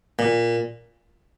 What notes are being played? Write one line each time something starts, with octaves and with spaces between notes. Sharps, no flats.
A#2